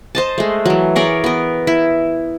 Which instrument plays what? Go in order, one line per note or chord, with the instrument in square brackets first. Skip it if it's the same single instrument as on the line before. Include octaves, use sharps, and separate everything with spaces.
[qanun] C5 D#5 A5
G#3 A3
E3 F#3
G#4 A#4 C#5 D5
B3 A#4
E4